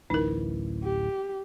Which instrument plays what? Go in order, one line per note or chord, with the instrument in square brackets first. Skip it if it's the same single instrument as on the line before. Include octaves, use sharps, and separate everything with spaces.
[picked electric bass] D1 A1 E3 [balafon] D#4 A#4
[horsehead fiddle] G4